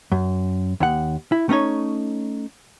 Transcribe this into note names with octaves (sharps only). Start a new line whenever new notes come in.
F#2
D#2 F#5
E4
A3 C#4 D#4 C#5